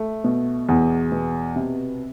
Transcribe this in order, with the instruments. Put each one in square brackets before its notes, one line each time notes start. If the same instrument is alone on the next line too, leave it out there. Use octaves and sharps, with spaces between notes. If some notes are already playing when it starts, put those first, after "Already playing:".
Already playing: [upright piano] A3
B2
E2
B2
C3